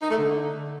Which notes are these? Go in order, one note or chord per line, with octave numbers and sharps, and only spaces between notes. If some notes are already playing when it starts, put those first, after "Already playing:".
D#4
A3
D3